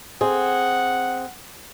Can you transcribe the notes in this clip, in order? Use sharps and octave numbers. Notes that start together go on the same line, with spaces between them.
C4 G#4 F#5